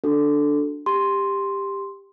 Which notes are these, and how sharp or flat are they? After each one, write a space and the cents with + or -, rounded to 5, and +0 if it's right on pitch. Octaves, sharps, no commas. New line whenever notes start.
D4 +0 F#4 +0 A4 +0
G4 +10 C6 +0